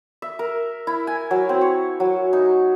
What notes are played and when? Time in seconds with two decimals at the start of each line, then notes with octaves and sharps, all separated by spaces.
0.22 E5
0.39 A#4
0.87 E4
1.07 G#5
1.31 F#3
1.49 C4
1.61 C#5
2.00 F#3
2.33 D#4